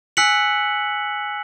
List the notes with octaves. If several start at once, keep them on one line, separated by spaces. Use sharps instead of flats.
G#5 E6 F#6 B6 C#7 F#7